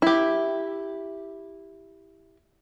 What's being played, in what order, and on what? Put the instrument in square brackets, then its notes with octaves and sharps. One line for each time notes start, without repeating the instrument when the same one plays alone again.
[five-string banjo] E4 G4